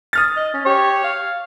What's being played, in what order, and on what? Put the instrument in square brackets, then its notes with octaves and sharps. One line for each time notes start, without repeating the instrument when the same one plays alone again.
[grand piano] D#6 F6 A6
[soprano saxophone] D#5
C#4
[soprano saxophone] G4 [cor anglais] C#5
[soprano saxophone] F5